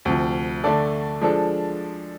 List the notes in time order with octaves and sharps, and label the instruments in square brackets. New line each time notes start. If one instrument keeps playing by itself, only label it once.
[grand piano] D2 C3 F3
D3 A3 D4 A4 D5
F3 G#3 D4 A4